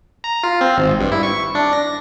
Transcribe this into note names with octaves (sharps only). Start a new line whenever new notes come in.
A#5
F4
C4
G#1
G2
E4
C#6
D4
A#6